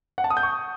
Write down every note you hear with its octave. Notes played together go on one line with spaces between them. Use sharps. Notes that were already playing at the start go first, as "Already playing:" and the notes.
F#5
A5
D#6
G6
C#6